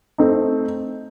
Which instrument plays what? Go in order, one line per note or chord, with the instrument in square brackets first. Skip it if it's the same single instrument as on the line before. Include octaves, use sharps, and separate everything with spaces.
[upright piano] A3 C4 D#4